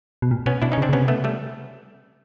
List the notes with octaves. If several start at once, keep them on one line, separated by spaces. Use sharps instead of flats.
B2
A#2
B2 B3 C#4
B2 D4 E4
C#4 D#4
C#3
C4 D4
C#3
C3 B3 C#4
A3 B3
G3 A3